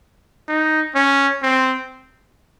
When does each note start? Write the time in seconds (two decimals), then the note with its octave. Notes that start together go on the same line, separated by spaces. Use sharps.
0.48 D#4
0.95 C#4
1.43 C4